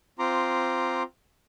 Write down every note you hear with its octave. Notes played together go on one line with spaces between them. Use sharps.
C4 F4 A#5 C6 D6